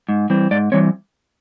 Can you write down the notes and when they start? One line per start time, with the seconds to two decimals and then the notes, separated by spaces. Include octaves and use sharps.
0.09 G#2
0.30 E3 G3 C4
0.51 G#2 D5
0.72 E3 G3 C4 C#5